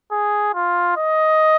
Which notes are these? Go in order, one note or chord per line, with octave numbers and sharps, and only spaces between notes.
G#4
F4
D#5